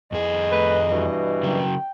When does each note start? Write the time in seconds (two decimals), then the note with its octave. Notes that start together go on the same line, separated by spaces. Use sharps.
0.12 F2 G#4 D#5
0.52 A3 B4
0.90 G2 B2 E3
1.43 C#3 F#3 G5